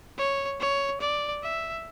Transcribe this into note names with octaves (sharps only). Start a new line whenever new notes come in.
C#5
C#5
D5
E5